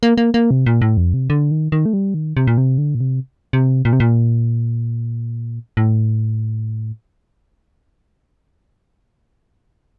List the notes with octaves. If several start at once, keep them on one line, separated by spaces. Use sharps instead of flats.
A#3
A#3
A#3
C3
A#2
A2
F2
C3
D3
D#3
D#3
A3
G3
D#3
C3
A#2
C3
D3
A#2
C3
C3
A#2
C3
A#2
A2